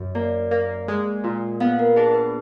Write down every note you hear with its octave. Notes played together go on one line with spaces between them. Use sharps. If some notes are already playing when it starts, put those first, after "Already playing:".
Already playing: F#2
A#3 D5
A#3
G#3
A#2
B3 F5
A#4
D4 G#4
B4